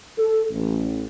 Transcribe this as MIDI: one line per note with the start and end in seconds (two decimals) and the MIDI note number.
0.17 0.46 69
0.52 1.06 33